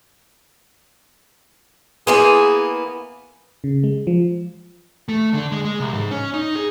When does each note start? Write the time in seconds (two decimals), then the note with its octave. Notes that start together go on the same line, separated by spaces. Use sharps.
2.07 E3 A#3 B3 G#4 G#5 C6
3.64 C#3
3.84 G#3
4.07 F3
5.09 A3
5.34 D3
5.52 G#3
5.65 G#3
5.80 C2
5.94 G#2
6.11 C#4
6.34 D#4
6.55 G#4